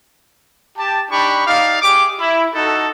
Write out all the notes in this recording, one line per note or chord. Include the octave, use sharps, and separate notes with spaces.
G4 A5
D4 D#4 G4 B5 C#6
D#4 G4 D5 F5
G4 G#4 D6
E4
D#4 F#4 A4